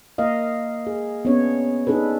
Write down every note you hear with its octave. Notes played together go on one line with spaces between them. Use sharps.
A#3 A#4 D#5 F5
G#4
B3 C#4 D4 C#5
D4 D#4 G#4 A4 B4